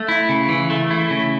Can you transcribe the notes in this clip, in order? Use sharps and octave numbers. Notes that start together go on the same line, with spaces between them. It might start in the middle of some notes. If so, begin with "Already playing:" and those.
Already playing: A3
E4
C#3
E3
A3
E4
C#3